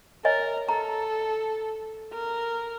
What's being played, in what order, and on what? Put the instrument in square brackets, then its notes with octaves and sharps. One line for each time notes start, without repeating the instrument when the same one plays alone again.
[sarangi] A#4 [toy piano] C#5 D#5 G#5
[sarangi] A4 [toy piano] A#5
[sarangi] A#4